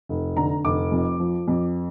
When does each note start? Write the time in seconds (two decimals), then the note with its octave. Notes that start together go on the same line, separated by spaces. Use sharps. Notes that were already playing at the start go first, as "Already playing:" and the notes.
0.09 F1
0.37 D3 A#5
0.65 F1 D6
0.92 F2
1.20 F3
1.48 F2